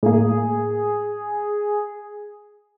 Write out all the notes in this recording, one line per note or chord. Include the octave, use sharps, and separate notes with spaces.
A2 A#3 G#4